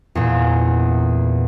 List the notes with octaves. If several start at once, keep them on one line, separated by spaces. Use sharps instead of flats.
E2 A#2